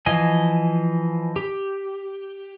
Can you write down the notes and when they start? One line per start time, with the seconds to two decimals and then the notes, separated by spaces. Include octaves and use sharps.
0.06 E3 F3 D#5 G#5
1.36 G4